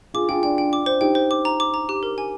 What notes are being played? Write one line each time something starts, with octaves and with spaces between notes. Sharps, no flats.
F4 G#4 D6
F4 G#4 G5
D4 F4 G5
G5
D6
C5
D#4 G4 G5
C5
D6
A#5
D6
A#5
G4
A#4
G#5